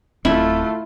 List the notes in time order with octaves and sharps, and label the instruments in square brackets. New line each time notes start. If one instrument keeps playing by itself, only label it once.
[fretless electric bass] D1 C4 [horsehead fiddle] A3 F4 [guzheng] E4